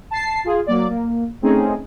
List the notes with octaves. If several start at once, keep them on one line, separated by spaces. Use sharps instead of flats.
A5 C7
F4 G#4
F#3 A#3 D5
A#3
A3 C4 C#4 D#4 G#4